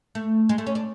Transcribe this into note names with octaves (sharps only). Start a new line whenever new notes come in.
A3
G#3
A3
C#4
D4